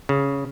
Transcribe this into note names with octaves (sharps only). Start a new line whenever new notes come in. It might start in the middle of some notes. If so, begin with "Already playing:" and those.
C#3